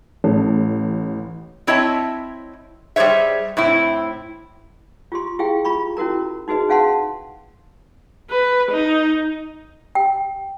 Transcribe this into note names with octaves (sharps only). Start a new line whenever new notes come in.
A1
C4 E4 C#5 D#5 E5 A5
G3 G#4 C5 C#5 E5
A2 C4 E4
F4 G4 C6
E4 G4 G#4 F5 G5
F4 A#5 B5 C#6
C#4 E4 F#4 A#4 A#5
D#4 F#4 G#4 B4 D#5
C#4 G#4 F5 F#5 A5 C6
B4
D#4
G5